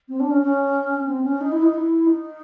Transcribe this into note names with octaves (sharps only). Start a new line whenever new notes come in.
C4
D4
C#4
C#4
C4
C#4
D#4
E4
D#4
E4
D#4